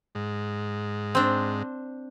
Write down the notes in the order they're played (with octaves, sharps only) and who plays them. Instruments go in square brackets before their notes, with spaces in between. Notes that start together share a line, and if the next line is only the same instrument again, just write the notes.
[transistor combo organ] G#2
[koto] C4 D4